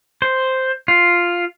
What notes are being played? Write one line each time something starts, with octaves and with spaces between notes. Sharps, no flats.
C5
F4